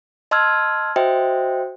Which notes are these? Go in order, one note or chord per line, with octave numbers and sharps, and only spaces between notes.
D#5 A5 C6 E6 F6 G#6
F#4 C5 D#5 E5 G5